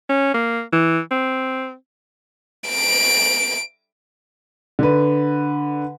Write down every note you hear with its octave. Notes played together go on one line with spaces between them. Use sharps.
C#4
A#3
E3
C4
D7
D3 B4